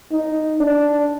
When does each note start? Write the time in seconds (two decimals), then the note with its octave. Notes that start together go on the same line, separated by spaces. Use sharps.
0.11 D#4
0.60 D4